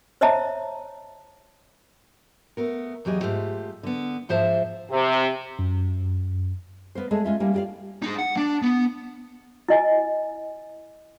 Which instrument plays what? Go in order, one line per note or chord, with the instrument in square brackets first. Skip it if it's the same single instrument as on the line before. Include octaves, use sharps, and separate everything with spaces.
[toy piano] C5 C#5 D#5 E5 A5 A#5
[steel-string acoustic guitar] A3 B3 A#4
E2 F#3 G4 G#4 D#5
G#2 C#3 A3 F4 G4
D3 B3
G#2 F3 C5 E5 A5 A#5
[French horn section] C3
[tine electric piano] F#2
[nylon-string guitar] B3 A#4 C5
G#3 A3 G#4 A4 C#5
G#3 C#4 F4 E5
G3 A#3 C#4 E4
F4 G4 A#4 D5 F5
[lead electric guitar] D#4 G#4
F#5
D4
B3
[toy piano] E4 D#5 G#5